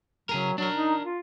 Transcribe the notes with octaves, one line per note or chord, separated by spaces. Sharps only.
C#3 F#3 G#4 A#4
F#3 D4 A#4
D#4
F4